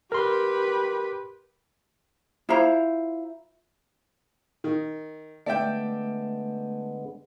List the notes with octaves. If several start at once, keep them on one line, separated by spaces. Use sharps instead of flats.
G4 A#4 B4 C6
E4 F4 C5 A#5
D#3
D3 G#3 A3 B3 D5 E5 G5